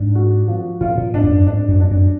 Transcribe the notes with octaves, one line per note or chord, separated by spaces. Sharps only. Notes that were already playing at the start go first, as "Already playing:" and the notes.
Already playing: G#2 D4
F#4
F3
A#2 F4
A#2
G#2 D4
F2
F#2
G#2 D4
F#2
D4
F#2